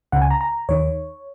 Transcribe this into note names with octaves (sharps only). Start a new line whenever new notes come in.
C#2 C#3 F#5
G#5
A#5
A#5
D#2 D#3 C#5